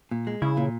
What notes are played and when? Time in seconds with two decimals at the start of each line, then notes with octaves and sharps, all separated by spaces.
0.11 A#2
0.27 G#3
0.42 C#3 E4
0.57 A#2